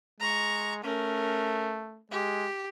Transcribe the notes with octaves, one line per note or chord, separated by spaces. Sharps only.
G#3 A#5 C#6
A3 C#4 A#4
G#3 G4